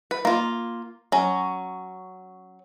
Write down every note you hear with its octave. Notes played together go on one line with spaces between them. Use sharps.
B4
A#3 F4
F#3 C#4